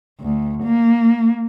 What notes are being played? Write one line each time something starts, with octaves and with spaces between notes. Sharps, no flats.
D2
A#3